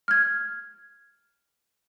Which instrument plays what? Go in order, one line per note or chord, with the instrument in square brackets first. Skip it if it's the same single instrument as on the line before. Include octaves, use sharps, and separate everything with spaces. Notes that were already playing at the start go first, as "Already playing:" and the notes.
[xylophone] F6 G#6